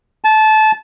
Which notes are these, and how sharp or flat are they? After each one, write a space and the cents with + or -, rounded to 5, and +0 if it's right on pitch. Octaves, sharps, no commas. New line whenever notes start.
A5 -20